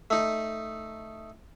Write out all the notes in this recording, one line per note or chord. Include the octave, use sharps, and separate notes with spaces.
A3 D#4